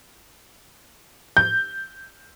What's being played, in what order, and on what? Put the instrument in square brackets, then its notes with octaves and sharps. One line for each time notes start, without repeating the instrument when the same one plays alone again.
[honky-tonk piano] G6